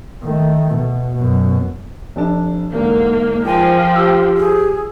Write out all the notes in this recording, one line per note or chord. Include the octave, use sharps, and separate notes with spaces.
D#3 A3
B2
F#2 B2
F1 D4 A5
E2 G#2 D3 A#3
F3 G#4 A#4 G5 G#5
G4 E6
G#4